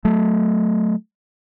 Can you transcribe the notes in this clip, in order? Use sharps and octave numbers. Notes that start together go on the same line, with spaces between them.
F#3 A3